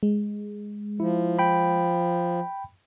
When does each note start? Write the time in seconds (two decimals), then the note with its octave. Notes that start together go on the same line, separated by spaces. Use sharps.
0.03 G#3
1.00 F3 E4
1.39 G5 B5